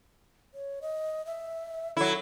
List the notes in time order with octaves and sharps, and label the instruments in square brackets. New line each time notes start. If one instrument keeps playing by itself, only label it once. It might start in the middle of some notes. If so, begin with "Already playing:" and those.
[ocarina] C#5
D#5
E5
[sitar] F#3 E4 [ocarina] A4